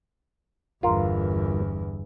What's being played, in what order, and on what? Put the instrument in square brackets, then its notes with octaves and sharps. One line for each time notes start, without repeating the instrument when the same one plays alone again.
[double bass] G1 E2 [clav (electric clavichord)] F4 A#4